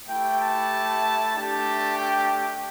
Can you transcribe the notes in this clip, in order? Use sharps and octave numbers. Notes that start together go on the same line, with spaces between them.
A3 E4 G4 G5
A5
A3 D4 G4 A5
G5